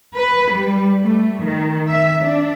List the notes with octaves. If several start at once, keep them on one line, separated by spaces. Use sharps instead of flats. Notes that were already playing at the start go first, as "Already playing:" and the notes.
B4
G3
A3
D#3
E5
D4